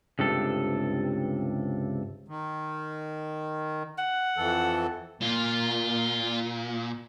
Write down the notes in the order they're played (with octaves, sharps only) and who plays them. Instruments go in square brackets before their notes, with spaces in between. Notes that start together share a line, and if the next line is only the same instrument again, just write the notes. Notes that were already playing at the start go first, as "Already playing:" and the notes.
[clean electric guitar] C#2 G2 C3 A4
[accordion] D#3
[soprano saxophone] F#5
[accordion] F2 E3 A4
[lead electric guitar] A#2 [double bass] A#3 [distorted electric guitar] F4